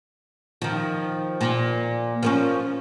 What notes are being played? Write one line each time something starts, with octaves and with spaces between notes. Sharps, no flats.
D#3 F3
A#2
F3 A#3 C#4